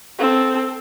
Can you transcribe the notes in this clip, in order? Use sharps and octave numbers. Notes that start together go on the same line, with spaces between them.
C4 A4